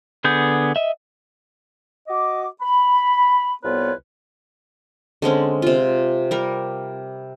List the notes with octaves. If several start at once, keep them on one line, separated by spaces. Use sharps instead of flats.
D3 B3 G#4 G6
D#5 E5
F#4 D#5 D6
B5
C2 B3 F4 B4 C#5
D3 G#3 C4 C#4
C3 F4
G3 A#4